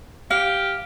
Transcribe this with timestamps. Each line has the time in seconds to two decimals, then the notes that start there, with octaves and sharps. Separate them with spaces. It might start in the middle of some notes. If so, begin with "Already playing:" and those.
0.31 G4 F5